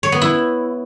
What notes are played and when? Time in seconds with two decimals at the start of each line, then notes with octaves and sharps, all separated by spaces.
0.03 C#5
0.12 B3
0.22 E4